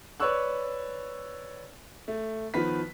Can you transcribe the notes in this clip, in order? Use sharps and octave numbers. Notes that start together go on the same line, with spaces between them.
B4 C#5 D5 C#6 E6 F#6
A3
D#3 F3 B3 B4 B6